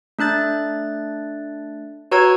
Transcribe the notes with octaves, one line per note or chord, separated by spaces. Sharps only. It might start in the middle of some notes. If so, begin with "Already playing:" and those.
A3 D4 F#6 A6
F#4 B4 C#5 A#5 E6 G#6